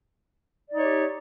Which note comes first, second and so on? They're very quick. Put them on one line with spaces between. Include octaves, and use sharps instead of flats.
D5 D#4 C#5 G4